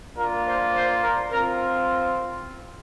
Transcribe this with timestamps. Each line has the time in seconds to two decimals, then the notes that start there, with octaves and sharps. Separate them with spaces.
0.17 A#3 D4 F4 A#4
0.46 C5
0.74 C5
1.01 A#4
1.30 C4 F4 A#4